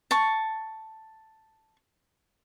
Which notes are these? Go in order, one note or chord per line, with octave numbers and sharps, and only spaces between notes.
A5 C#6